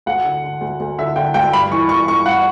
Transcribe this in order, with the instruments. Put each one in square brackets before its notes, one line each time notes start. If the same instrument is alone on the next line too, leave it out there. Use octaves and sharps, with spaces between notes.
[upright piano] D2 F#5
D3
D3
D2
D2
D3 E5
D3 G5
D2 G5
G2 B5
E3 C#6
E3 C#6
G2 C#6
G2 F#5